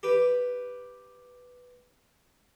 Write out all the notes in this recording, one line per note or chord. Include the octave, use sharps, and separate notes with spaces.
G4 B4